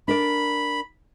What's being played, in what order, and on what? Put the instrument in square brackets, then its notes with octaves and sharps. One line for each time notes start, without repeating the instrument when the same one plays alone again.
[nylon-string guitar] D4 A#4 D5 [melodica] B5